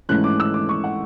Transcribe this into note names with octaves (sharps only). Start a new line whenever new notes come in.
G#2 E3 A3 C#4 F#6
D6
E6
D6
C#6
F#5